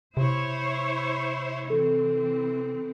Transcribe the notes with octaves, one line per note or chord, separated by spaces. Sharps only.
C3 E4 C5 C#5
E3 C4 A4